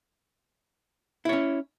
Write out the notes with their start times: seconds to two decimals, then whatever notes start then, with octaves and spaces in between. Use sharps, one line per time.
1.25 E4
1.29 C#5
1.33 C#4